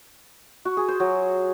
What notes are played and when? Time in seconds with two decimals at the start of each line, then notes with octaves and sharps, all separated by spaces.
0.65 F#4
0.77 G#4
0.88 C5
1.00 F#3